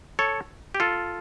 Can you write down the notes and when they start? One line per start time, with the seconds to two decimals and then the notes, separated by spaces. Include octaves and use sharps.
0.19 A4 C#5
0.75 G4
0.80 F4 A4